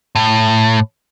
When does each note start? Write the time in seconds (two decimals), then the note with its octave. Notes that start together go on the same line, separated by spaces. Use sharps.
0.15 A2